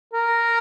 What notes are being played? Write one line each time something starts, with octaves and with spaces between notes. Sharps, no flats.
A#4